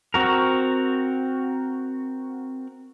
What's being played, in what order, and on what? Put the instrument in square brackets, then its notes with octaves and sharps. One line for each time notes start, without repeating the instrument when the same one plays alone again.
[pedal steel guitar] C4 F#4 A#4